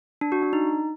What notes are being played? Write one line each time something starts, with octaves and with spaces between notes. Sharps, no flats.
D4
F#4
D4
D#4